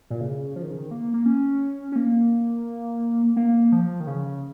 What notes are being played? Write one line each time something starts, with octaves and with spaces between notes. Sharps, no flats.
A#2
C#3
F3
D#3
C#3
D#3
A#3
A#3
C#4
C#4
A#3
A#3
F3
D#3
C#3